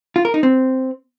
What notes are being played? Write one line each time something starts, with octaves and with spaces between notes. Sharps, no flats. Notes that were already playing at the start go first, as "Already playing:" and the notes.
F4
A#4
D#4
C4